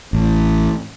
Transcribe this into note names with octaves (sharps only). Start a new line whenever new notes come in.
A1